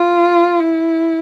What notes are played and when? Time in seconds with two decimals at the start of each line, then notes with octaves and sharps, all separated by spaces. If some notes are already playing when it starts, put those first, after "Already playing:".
Already playing: F4
0.60 E4